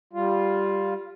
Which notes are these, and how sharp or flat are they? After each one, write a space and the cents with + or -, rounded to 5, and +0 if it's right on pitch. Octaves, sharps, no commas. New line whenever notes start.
G3 +0 F4 +0